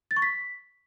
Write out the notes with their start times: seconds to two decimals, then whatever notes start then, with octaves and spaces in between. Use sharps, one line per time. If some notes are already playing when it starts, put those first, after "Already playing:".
0.11 A6
0.16 C#6
0.22 B6